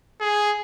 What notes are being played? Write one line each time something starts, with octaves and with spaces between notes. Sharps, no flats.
G#4